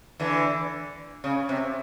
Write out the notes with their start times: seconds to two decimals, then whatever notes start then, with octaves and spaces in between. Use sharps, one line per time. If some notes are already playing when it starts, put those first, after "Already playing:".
0.19 D3 E3
1.24 C#3
1.49 C3